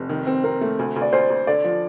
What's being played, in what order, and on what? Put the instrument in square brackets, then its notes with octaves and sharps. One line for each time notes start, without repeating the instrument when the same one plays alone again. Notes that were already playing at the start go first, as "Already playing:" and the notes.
Already playing: [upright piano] F1
D#3
C4
[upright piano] C4 [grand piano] A#4
[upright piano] A3
D2
D2
[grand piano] D5
[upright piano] D2 [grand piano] C5
[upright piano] D2
[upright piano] D3 [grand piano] D5
[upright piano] F3